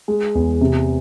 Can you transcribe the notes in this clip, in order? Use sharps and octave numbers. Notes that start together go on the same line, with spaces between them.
G#3
E2
C3